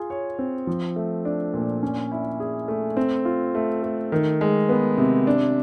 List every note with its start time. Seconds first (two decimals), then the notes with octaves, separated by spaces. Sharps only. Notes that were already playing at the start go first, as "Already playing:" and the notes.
Already playing: F4 G#4
0.10 C#5
0.39 C4
0.67 F3
0.96 A3
1.25 D4
1.54 A#2
1.83 C#4
2.12 E4
2.40 G#4
2.68 A3
2.97 C4
3.25 F4
3.55 A3
3.83 A3
4.12 D#3
4.41 G#3
4.69 B3
4.98 C3
5.27 D4